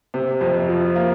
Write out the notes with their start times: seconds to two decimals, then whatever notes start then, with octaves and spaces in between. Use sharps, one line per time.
0.14 C3
0.41 F2
0.69 F3
0.96 A#3